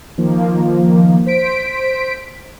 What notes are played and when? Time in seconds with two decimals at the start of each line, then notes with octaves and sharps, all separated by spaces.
0.18 D#3 F3 A#3
1.26 C5 B6 D7